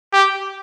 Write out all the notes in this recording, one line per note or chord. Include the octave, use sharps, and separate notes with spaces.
G4